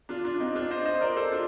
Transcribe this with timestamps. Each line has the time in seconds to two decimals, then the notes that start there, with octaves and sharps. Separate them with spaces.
0.09 D4 F4
0.25 D4 F4
0.40 C4 D#4
0.55 D4 F4
0.71 C5 D#5
0.85 C5 D#5
1.01 A#4 D5
1.16 A4 C5
1.32 D4 F4